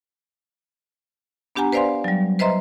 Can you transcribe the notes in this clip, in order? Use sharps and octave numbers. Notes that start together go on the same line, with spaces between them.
B3 D4 G4 F#5 G#5 A#5
B4 C5 D5 F5 G#5 C6
F#3 G3
B4 C5 D#5 E5 A#5 C6